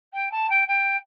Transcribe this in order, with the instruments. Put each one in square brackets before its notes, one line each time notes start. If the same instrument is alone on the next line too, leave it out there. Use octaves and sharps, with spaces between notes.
[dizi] G5
A5
G5
G5